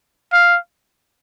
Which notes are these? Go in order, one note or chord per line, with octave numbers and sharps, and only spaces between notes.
F5